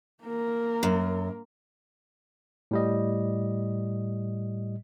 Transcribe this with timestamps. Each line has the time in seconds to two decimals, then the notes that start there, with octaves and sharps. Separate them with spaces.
0.24 A#3 A#4
0.83 F#2
2.71 A2 G3 D#5